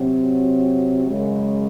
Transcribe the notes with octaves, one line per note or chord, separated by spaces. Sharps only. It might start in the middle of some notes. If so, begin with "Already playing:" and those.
Already playing: C3 F#3 C4
F#2 C#3 G#3